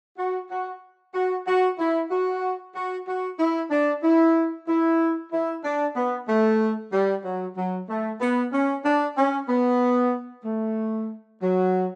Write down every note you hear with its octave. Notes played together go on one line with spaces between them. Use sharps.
F#4
F#4
F#4
F#4
E4
F#4
F#4
F#4
E4
D4
E4
E4
E4
D4
B3
A3
G3
F#3
F#3
A3
B3
C#4
D4
C#4
B3
A3
F#3